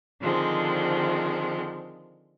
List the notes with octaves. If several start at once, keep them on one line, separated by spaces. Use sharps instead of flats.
D3 D#3 F3 G#3 C4